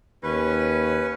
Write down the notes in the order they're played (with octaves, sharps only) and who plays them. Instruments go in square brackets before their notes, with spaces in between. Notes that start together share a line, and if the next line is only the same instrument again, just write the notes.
[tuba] D#2 [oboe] C#4 [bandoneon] B4